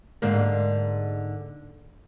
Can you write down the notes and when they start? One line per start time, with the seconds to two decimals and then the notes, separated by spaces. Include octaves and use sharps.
0.22 G#2 D3 A#3